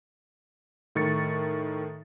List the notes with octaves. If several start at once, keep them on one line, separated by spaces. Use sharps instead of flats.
A2 D#3 C#6 A6 C#7